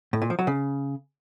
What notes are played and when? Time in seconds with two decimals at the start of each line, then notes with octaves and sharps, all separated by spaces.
0.13 A2
0.22 A#2
0.30 F3
0.39 F#3
0.47 C#3